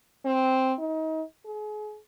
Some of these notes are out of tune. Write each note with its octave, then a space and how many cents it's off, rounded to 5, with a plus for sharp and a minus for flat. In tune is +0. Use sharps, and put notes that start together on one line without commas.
C4 +0
D#4 +30
G#4 +35